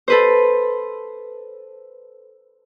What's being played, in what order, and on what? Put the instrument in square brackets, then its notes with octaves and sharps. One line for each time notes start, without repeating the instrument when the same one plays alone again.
[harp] A4 B4 C5